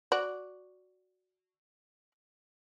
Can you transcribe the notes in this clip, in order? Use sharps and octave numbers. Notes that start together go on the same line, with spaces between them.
F#4 D5